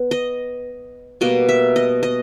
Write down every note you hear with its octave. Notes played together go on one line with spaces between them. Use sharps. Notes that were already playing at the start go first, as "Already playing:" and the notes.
Already playing: B3
D#5
B2 G3 A#3 D#5
E5
D#5
D#5